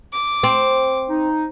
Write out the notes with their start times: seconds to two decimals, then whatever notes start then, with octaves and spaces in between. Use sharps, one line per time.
0.13 D6
0.43 C4
1.09 D#4